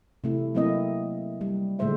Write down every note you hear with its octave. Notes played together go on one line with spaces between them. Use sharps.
C3 A3 E4
F#3 A3 A#3 C4 E4 D#5
G3
A#2 D3 G#3 A3 C5 E5